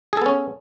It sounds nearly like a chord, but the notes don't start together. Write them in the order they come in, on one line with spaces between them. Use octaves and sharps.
G#4 A4 B3 C#4